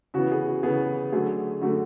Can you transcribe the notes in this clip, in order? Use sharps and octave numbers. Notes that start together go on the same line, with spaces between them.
C#3 E3 B3 F#4
G#4
F#4
C#3 E3 B3 G#4
D3 F#3 A3 G#4
D3 F#3 A3 F#4 A4